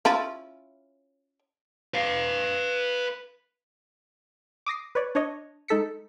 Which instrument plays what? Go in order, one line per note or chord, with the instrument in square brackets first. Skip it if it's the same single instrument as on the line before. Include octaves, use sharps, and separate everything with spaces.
[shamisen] C#4 E4 F4
[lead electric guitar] B4 F5
[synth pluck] D6 D#6 A#6 C7
B4 C#5 D5
D4 C#5 D#5
G#3 D#4 A4 B6 C#7